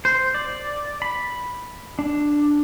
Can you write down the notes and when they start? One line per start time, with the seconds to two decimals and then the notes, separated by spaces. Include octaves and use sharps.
0.05 C5
0.34 D5
1.02 B5
1.99 D4